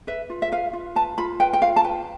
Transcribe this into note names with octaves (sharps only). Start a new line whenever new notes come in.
B4 E5
F4
E5
B4 F5
F4
B4 A5
F4 B5
B4 G5
G5
F4 F5
A5
B4 G5